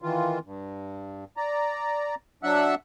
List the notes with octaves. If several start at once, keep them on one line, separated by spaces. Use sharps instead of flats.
D#3 E3 F4
G2
D5 A#5
F#3 D4 E5 F#5 E6 F#6